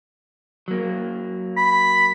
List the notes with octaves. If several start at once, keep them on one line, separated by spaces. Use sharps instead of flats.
F#3 A#3
B5